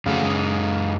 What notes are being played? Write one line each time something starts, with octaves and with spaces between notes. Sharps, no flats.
F2 C#3 A3 F#4 F5
F#2 G#3